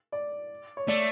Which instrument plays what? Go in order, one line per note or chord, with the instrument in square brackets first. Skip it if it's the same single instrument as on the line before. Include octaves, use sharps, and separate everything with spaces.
[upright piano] D5
C#5
[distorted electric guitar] A3 [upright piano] D5